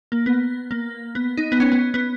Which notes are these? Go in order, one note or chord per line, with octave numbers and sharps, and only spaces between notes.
A#3
B3
A#3
B3
D#4
B3
C#4
B3
B3